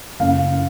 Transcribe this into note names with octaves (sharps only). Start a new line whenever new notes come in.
F#1 F5